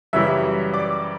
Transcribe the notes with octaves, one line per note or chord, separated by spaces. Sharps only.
F#2 C#3 E3 G3 E5 E6
D5 D6